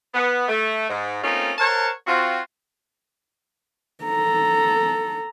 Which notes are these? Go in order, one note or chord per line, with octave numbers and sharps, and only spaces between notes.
B3
A3
G#2
A3 A#3 C4 C#4 D#4 F4
A4 A#4 C5 C#5 F#5 A5
C4 F4 F#4
A4 A#5